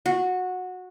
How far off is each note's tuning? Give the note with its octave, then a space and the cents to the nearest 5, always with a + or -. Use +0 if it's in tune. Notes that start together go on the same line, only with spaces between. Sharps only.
F#4 -15